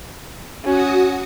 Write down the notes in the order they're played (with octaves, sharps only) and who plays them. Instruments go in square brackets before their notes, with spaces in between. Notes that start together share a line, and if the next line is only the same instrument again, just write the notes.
[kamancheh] C#4 [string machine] F#4 F#5 D#6